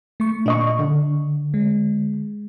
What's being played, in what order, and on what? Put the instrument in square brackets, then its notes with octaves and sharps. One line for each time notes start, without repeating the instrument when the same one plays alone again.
[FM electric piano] A3 C#6
[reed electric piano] A#2 D#5 C#6 [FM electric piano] D4
[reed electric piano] D3
[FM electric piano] G#3